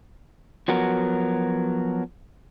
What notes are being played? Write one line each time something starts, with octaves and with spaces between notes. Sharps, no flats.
F3 F#3 B3 F#4 A#4